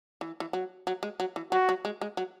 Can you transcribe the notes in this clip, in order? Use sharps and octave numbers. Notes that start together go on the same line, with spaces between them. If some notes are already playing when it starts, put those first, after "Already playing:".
E3
E3
F#3
F#3
G#3
F#3
E3
F#3 F#4
F#3
G#3
G#3
F#3